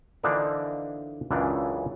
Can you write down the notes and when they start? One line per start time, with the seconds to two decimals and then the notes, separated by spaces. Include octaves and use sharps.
0.23 D3 E3 F3 A#3 D4 D#4
1.31 C#2 F#2 C#3 E3 D4